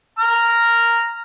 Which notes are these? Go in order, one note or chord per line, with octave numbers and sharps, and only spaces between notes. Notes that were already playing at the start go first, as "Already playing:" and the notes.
A#5 F6